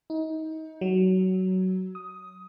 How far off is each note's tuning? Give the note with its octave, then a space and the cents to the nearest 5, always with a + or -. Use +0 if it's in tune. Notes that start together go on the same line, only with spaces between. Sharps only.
D#4 +30
F#3 +15
D#6 +10